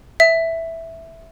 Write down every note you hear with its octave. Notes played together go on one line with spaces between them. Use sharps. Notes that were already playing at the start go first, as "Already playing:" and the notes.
E5